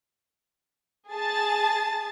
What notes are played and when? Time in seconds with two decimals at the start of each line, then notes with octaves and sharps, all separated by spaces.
1.13 G#4 A5 A6